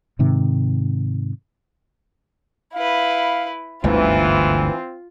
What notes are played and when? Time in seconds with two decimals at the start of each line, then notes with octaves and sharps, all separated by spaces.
0.19 G#2 C3 D#3
2.74 E4 B4 F5
3.84 G1 D2 G#2 E3 C4 F4